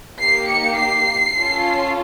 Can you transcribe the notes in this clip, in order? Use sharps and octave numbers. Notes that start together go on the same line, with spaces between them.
A#3 D#4 G4 C7
C#7
C7
C#4 F4 A4